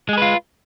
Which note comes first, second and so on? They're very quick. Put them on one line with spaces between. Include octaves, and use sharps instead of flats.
G#3 G#4 B4 F4